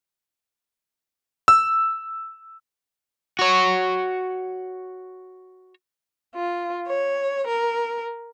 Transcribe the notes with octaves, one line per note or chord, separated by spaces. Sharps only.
E6
F#4 C#5
F4
C#5
A#4